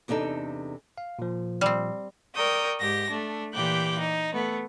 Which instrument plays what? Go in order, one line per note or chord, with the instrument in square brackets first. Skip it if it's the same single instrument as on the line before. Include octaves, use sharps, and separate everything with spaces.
[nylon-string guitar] E2 C3 D4 D#4 A4
[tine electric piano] F5
A#2 F3
[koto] G3 C4
[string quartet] A#4 D5 G5 C#6 D#6
G#2 G4 A#6
A3 D4
A#2 E3 G4 G5 D6 F#6
D#4
A3 B3